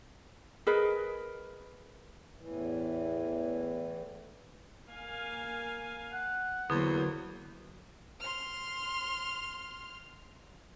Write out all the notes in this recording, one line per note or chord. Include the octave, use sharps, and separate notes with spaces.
G#4 A#4 B4 D#5
E2 A2 E3
A#3 F5 G#5
F#5
E2 D3 F#3 A#3 C5
C6 F6